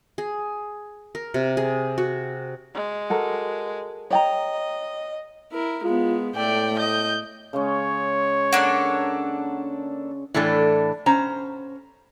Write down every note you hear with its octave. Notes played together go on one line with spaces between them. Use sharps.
G#4
A#4
C3
G#4
F#4
G#3
F#4 A4 A#4
C#5 D#5 G5 A#5
E4 A#4
G#3 B3 F4
A2 A3 D5 G5
D#5 G6
C#3 G#3 C#4 C#5
A#3 D4 A4 F#5
A2 E3 A3 D4 A4
C#4 C5 A#5